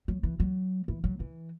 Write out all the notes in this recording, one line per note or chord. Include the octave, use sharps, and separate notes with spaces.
F#3
E3
F#3
E3
F#3
E3